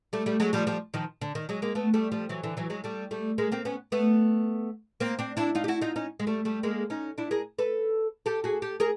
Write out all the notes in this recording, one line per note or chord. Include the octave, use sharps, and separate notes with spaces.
G3 A3
G3 A3
F#3 G#3
F3 G3
F3 G3
D#3 F3
D3
D#3
F#3 G#3
G#3 A#3
A3 B3
G3 A3
F3 G3
E3 F#3
D3 E3
E3 F#3
F#3 G#3
G3 A3
G3 A3
G#3 A#3
A#3 C4
B3 C#4
A3 B3
A#3 C4
C4 D4
D4 E4
D#4 F4
G4
E4 F#4
D#4 F4
C#4 D#4
G#3
G3 A3
G3 A3
G#3 A#3
C#4 D#4
D4 E4
G#4 A#4
A4 B4
G4 A4
F#4 G#4
G4 A4
G#4 A#4